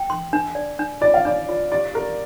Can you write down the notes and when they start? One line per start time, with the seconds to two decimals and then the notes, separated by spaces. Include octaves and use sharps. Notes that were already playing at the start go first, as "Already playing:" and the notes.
Already playing: G5
0.10 C6
0.33 D4
0.55 D5
0.79 D4
1.01 F4 D5
1.14 F5
1.25 D4 D5
1.49 F4
1.72 G4 D5
1.94 G4 A#4